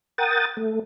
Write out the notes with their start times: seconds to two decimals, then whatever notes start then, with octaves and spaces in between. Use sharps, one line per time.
0.18 A#4 F#5 G5 D#6 A6
0.57 A3